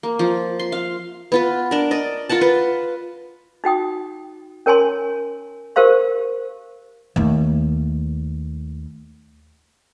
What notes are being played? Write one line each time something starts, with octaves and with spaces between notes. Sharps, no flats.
A#3
F3
C6
F5
B3 F4 B4
D4 A#4
D5 D#5
F4 A#4 F#5 A5
F4 B4
D#4 F#4 G5 D#6
C#4 A#4 C#5 G#5 A5 C6
G4 A#4 C5 F5 C6
D#2 A3